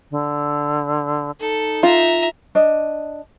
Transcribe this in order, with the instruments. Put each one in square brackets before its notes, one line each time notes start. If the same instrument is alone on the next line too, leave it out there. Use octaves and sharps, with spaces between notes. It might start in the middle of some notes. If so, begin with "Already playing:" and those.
[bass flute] D3
[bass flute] D#4 [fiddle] A4
[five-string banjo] F4 [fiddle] E5 A#5
[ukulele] D4 D#5